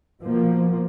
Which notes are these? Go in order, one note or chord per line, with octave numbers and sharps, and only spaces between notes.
B2 F3 A#3